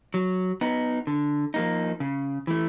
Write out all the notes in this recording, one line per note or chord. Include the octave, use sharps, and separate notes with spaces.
F#3
B3 D#4
D3
F3 A#3 D#4
C#3
E3 A3